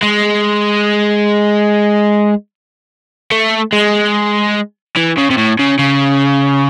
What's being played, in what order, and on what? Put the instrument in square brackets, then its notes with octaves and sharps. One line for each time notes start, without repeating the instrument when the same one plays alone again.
[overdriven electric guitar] G#3
A3
G#3
E3
C#3
C3
A2
C#3
C#3